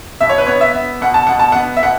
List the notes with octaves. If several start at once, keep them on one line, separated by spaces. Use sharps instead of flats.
B2 E5
C#5
B4
B3 C#5
E5
B3
B2 F#5
A5
B2 F#5
A5
B3 F#5
E5
B2 F#5